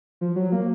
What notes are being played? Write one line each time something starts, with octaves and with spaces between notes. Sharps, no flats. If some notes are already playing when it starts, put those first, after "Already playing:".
F3
F#3
A#3